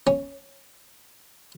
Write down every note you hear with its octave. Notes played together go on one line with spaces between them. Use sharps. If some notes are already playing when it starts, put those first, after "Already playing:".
C#4